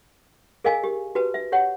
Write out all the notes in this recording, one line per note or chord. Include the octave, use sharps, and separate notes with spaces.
G#4 A#4 D#5 F5 G#5
G4
F#4 G4 B4 A5
E5
G4 C#5 F#5